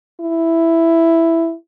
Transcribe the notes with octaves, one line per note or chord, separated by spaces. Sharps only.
E4